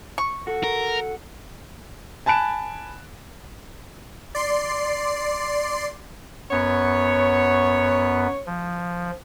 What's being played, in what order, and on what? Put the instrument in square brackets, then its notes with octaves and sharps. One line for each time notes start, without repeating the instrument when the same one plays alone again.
[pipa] C#6
[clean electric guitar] F#4 [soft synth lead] A4
[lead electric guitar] A#4
[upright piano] G#5 A5 B5 F#6 D7 E7
[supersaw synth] D5 C6 C7
[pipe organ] F#2 B3 [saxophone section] C#5
[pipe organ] F3